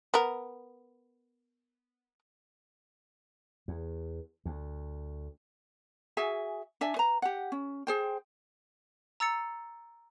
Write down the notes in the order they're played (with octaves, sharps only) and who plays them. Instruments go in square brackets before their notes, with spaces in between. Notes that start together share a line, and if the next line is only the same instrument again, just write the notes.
[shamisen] B3 A#4
[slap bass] E2
D2
[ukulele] F#4 G#4 E5 G#5
D4 D5 E5 G#5
B4 A#5
G4 F#5
C#4
G#4 C5 G5
[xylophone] A#5 E6 A6 C#7